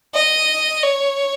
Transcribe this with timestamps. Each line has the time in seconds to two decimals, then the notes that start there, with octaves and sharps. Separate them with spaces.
0.15 D#5
0.83 C#5